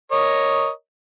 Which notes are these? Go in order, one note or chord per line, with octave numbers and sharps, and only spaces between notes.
A#4 C#5 D#5